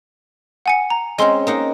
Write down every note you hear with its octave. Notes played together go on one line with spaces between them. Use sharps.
F#5 G#5 C#7
A#5
G#3 C4 C#4 D#5 C6
A#3 D#4 F#5